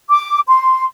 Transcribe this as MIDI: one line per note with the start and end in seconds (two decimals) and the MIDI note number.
0.09 0.40 86
0.48 0.85 84